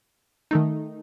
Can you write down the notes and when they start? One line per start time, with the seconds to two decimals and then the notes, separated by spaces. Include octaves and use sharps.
0.51 D#3 A3 D#4